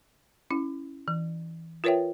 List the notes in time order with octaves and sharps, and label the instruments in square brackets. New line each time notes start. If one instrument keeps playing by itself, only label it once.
[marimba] C#4 E4
E3
F4 A#4 B4 C#5 E5 G5